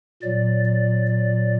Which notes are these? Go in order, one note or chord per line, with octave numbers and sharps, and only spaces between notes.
A#2 F#3 D5
D5
D5